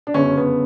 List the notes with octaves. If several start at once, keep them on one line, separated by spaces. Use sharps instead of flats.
D4
G1 F#2 C#3 C#4
B3